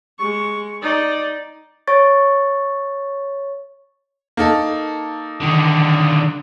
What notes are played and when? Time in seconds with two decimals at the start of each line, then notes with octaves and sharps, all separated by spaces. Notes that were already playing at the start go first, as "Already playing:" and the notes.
0.19 G#3 C#6
0.82 D#4 D5
1.87 C#5 C#6 A6
4.37 A#3 D#4 A4
5.40 D3 D#3